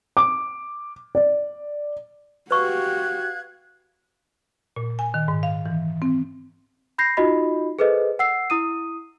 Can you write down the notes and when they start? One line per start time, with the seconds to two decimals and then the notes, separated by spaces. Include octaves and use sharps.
0.17 D6
1.15 D5
2.51 F#4 G4 B4 F5 C#6 F#6 G#6
4.76 A#2
4.99 G#5
5.14 D#3
5.28 G#2
5.43 F5
5.66 E3
6.02 C4
6.98 B5 G6 A#6 C7
7.17 D#4 F4 F#4 D#5 B5
7.79 G#4 A4 B4 C5 D#5
8.19 F#5 E6 C7
8.50 E4 D#6 D#7